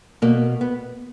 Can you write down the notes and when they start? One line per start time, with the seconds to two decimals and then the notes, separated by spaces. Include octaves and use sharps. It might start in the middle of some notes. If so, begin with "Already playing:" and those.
0.22 B2 A#3
0.61 B3